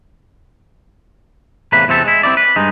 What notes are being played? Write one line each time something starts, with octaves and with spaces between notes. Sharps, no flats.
E2 A2 C3 A#3 B4 B5
E2 C3 C4 A4
G#3 E4
C4 D4 E4 D5
B4
G2 G#3 D#4